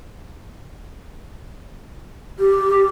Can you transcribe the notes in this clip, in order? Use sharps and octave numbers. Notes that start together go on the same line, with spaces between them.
G4